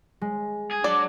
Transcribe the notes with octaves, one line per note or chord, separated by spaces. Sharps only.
G#3
G#4
F#3 D4 D5